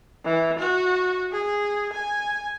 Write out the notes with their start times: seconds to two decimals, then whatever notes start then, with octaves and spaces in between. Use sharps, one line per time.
0.25 E3
0.59 F#4
1.32 G#4
1.93 G#5